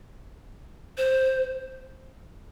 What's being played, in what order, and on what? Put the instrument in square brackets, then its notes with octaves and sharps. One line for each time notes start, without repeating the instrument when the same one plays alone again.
[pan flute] C5